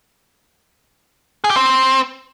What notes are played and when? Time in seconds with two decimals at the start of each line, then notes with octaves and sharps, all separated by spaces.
1.44 G#4
1.50 G4
1.56 C4